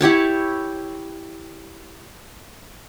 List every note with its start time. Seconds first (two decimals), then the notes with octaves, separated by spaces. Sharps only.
0.01 E4 G4 C#5 A5